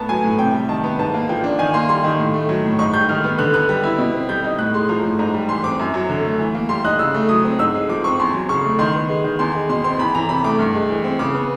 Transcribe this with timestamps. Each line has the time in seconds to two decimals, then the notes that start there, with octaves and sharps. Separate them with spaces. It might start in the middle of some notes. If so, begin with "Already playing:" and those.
Already playing: A2 B3 A5 A#5
0.09 F#3 G#5
0.24 A2
0.39 C3 G5
0.54 G3
0.69 D#3 A5
0.84 B3
0.99 G#2 A5
1.14 A#3
1.29 F3 G5
1.44 D4
1.59 D#3 G#5
1.74 A#3 C6
1.89 G3 C6
2.04 D#3
2.19 A2
2.34 A3
2.49 F#3
2.64 A2
2.79 G#2 C#6
2.94 G3 G6
3.09 D#3 F6
3.24 B3
3.39 D3 F#6
3.54 B3 F#6
3.69 G3
3.83 E4
3.98 B2
4.14 C4
4.29 G3 G6
4.44 D#4
4.58 A2 F#6
4.74 G#3 C6
4.89 F3 A#5
5.04 A2
5.19 G#2 A#5
5.34 G3
5.49 E3 C6
5.64 C4 D6
5.79 F#2
5.94 F#3
6.09 D3
6.24 A3
6.39 E3
6.55 A#3
6.69 G3 C6
6.84 D#4 F#6
6.99 C#3 E6
7.14 A3
7.29 F#3 D#6
7.44 C4
7.59 G#2 E6
7.74 G#3
7.89 F3 D6
8.04 C4 C#6
8.19 E2 C6
8.34 F#3
8.49 C#3 C#6
8.64 A3
8.79 D#3 C6
8.95 B3
9.09 G#3
9.24 D#3
9.39 E2 C6
9.55 G#3
9.69 B2 C6
9.84 C4 C6
9.99 E2 B5
10.14 E3 A#5
10.29 C3 B5
10.44 A3 D6
10.59 G2
10.74 G#3
10.89 E3
11.04 C4
11.19 C#3 D6
11.34 B3